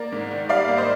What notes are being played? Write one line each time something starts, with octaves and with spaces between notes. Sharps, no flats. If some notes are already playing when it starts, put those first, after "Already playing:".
Already playing: A#3 A#4 D5
G#2
D#3
G3 D5 F5
A#3
C5 D#5